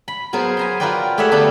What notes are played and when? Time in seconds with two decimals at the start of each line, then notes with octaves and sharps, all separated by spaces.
0.08 B5
0.33 F#3 B3 G#4 A#4 C5
0.57 G#5 A#5 C6
0.80 F4 F#4 A#4 B4 D5 G5
1.18 A3 G4 G#4 C#5 E5 F#5
1.31 D3 B3 D4 A4 D5 F5